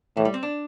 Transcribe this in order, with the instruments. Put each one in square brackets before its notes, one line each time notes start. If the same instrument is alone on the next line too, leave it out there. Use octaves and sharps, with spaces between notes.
[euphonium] A2 [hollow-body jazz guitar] E3
[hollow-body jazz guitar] G3
C4
D4